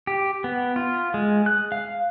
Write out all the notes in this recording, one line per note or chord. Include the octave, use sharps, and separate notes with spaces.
G4
B3
F4
G#3
F#6
F5